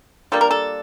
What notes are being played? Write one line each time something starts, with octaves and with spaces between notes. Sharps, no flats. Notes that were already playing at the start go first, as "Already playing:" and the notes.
G3 A#3 D4 F4 A4
A#4
A4